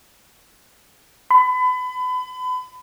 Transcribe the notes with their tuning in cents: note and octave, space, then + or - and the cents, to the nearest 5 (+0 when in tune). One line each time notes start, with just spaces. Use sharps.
B5 +30